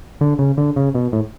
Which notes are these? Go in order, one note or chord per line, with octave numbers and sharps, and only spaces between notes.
D3
C#3
D3
C#3
B2
A2